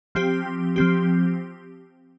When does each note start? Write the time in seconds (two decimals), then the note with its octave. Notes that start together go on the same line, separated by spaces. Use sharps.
0.15 F3 C4 G4
0.76 F3 C4 G4